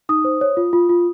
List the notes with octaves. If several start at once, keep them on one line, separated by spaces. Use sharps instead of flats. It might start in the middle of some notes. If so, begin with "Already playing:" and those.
D#4 D#6
C5
C#5
F4
F4
F4